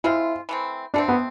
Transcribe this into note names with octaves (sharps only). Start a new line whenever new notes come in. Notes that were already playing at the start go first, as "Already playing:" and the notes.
G#3 C4 E4 F4
E3 A3 C4
B2 A3 C4 D4
B3